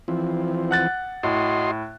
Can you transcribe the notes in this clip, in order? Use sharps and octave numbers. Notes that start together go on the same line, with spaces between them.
E3 F3 C4
F#5 F#6 A6
A2 F#4 D#5 C6